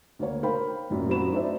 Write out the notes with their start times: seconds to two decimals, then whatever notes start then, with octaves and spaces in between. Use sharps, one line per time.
0.19 D2 A#3 C#5
0.43 A#4 C5 F5 G5 B5
0.90 A1 F#2 A#2
1.09 F#2 C4 F#4 B5 E7
1.32 A3 D4 D#4 C5 D5 E5